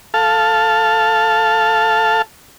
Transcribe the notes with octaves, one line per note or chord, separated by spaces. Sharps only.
A4 F5 A5